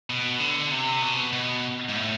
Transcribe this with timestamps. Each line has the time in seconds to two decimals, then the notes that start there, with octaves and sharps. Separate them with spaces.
0.10 B2
0.40 D3
0.72 C3
1.02 B2
1.33 B2
1.89 G#2
1.95 A2